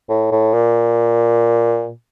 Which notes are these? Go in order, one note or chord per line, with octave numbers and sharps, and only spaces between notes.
A2
A2
A#2